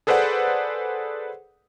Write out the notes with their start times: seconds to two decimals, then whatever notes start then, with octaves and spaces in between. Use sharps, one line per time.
0.07 G#4 A4 B4 C5 D5 F#5